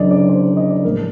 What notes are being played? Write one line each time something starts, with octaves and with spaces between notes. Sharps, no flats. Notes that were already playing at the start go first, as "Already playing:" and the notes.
Already playing: F#1 F#2 D3 D5 D#5
D5
C5
D#5
D5
A#1 A2 G3 A#4